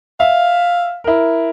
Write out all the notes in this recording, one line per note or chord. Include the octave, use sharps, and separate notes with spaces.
E5 F5
E4 A#4